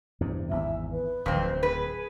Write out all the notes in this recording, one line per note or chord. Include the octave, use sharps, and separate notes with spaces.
E2 G2 C3
G#1 E2 G#2 E5
B4
D1 F2 C4
G#4 B4